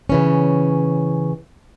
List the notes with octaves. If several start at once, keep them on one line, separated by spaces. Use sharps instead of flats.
C#3 E3 C#4